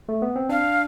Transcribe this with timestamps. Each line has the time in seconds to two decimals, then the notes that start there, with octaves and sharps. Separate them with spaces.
0.09 A3
0.22 B3
0.36 C4
0.49 D4 F5